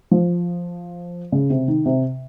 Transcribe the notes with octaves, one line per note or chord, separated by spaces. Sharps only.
F3
C#3
C3
D#3
C3